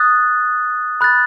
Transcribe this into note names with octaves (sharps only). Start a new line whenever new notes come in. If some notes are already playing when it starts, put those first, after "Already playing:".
Already playing: D#6 F#6 A6
B5 F#6 A6